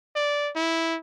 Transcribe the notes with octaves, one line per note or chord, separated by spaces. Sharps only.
D5
E4